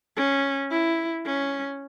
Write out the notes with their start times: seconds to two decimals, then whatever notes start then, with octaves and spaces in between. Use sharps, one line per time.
0.17 C#4
0.70 E4
1.25 C#4